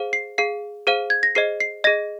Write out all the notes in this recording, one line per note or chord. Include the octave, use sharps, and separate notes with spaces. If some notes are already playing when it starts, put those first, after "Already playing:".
Already playing: G#4 C5 F5
C7
G#4 F5 C7
G#4 C5 F5 D#7
G#6
A#6
G#4 C5 D#5 C7
C7
G#4 D#5 A#6